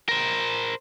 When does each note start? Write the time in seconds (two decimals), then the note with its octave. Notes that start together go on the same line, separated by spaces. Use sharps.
0.09 A#4 C5